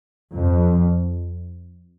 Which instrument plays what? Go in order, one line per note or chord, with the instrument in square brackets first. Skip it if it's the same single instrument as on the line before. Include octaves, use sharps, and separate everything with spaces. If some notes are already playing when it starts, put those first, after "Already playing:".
[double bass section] F2